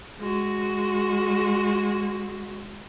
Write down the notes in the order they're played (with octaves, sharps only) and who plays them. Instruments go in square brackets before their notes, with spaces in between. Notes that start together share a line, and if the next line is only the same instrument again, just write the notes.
[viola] G#3 F#4